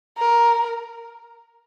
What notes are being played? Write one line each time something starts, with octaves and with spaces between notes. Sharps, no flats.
A#4